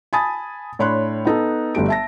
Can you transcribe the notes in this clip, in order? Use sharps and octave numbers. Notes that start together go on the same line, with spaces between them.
G#5 A5 B5 D#6 A6
A2 D4 C#5 B5 C6 F#6
B3 D#4 A4
G1 G3 A3 G4 D7
E5 A5 A#6